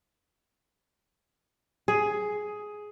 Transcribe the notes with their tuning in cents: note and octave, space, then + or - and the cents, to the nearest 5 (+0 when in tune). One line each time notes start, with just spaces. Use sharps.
G#4 +10